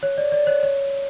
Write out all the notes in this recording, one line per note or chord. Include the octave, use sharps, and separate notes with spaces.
C#5
D5
D5
C#5
C#5